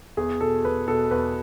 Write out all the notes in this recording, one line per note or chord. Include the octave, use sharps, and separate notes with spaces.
E2 G#4
B2 A4
E2 B4
B2 A4
E2 B4